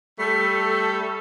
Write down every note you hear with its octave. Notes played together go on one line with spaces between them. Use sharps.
G3 A3 A4